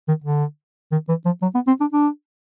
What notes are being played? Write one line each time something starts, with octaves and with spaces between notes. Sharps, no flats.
D#3
D3
D#3
E3
F3
F#3
B3
C4
D4
D4